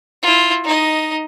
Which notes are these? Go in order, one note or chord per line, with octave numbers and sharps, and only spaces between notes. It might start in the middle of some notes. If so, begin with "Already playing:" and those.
E4 F4
D#4 D#5